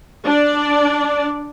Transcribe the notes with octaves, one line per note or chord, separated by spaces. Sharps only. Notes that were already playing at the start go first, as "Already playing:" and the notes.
D4 D5